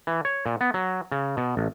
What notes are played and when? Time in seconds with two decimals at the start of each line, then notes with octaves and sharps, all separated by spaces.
0.07 E3
0.25 C#5
0.46 A#2
0.61 B3
0.74 F#3
1.12 C#3
1.37 B2
1.57 A1